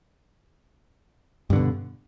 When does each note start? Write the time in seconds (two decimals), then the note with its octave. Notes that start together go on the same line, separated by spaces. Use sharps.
1.50 G2
1.53 D3
1.56 B2